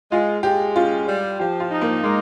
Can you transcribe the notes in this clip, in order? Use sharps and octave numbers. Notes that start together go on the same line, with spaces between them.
G#3 F4
G#3 G4
C#4 F4
G3
F3 G4
F4
D#4
A#3
G#3 A#3